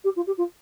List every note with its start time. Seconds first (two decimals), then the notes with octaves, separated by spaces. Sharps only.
0.04 G4
0.16 F4
0.27 G4
0.37 F4